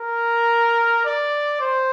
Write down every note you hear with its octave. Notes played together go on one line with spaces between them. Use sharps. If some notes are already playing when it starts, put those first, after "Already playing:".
Already playing: A#4
D5
C5